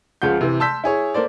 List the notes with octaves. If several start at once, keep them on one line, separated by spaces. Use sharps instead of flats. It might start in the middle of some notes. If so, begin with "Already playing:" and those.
C#2 C#3 F3 F#5 G6
C3 E3
A5 C6 E6 G6 B6
E4 G#4 C#5
A#3 A4 C5 D5